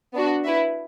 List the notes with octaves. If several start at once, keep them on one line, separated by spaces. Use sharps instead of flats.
B3 D4 F#4
E4 B4 E5